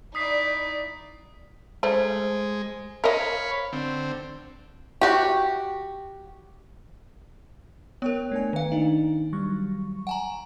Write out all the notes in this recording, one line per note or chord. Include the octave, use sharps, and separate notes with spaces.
D#4 E4 D5 D#6 B6 C7
G#3 A3 C5
A#4 C#5 D#5 F5 B5
D3 C4
F#4 G4
B3 A#4 C#5 G5
A3 D4 G#5
D#3 F5
A#3 D4 D#4
F#3 G3 C#6
F#5 G#5 A#5